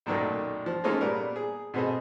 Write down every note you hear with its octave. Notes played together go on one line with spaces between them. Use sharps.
B1 F#2 A#2 D#3 A3 A#3
F3
G#3 A#3 C#4 D#4 F4 A4
A#2 G3 B3 A#4
G#4
B2 B3 C4 G#4 A4 D#5